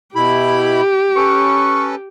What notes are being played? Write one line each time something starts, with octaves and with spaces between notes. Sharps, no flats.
B2 E4 G4 B5
C#4 A4 B4 C#6